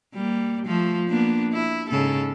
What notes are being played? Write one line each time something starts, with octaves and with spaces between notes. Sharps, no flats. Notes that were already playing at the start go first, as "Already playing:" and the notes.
G3 A#3
F3 A3
A#3 B3 D4
E4
G#2 C#3 A4